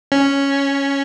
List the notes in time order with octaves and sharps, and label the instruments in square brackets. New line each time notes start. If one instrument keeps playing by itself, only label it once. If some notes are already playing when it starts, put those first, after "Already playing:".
[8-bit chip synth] C#4